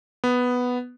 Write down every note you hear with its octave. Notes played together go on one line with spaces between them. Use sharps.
B3